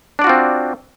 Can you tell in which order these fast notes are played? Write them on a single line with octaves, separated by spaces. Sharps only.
D4 D5 F#4 F4 C4